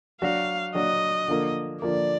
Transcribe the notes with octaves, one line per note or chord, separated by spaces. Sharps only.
F#3 D4 F#4 F5
F#3 D4 F#4 D#5
D3 F3 A#3
D3 F3 A#3 D5